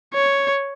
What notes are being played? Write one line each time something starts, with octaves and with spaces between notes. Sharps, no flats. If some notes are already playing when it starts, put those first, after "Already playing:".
C#5